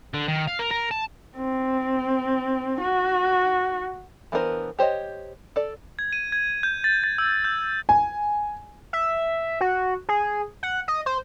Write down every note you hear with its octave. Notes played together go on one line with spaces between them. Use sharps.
D3
D#3
F5
A#4
A#4
A5
C4
F#4
E3 B3 D4 A#4 C5
G4 C5 C#5 D#5
A4 D5
G#6
D#7
G#6
G6
A6
A6
E6
G6
G#5
E5
F#4
G#4
F#5
D#5
C5